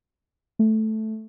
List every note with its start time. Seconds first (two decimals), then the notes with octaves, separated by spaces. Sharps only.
0.59 A3